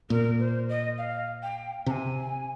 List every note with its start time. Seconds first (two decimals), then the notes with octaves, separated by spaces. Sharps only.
0.10 A#2 A#4
0.39 C5
0.69 D#5
0.98 F5
1.43 G5
1.86 C3 A#5
1.91 G#5